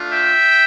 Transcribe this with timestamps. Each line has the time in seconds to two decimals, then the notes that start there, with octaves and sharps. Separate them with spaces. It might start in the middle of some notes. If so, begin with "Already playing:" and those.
Already playing: A3 D4 F4
0.12 E5 G5